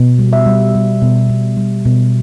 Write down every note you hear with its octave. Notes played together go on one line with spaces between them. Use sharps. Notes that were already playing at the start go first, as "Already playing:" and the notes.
Already playing: B2
G3
E5
G3
G3
B2
B2
G3
B2